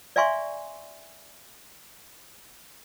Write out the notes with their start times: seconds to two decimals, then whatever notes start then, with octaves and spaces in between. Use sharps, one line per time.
0.16 D5 E5 F5 G#5 C6 C#6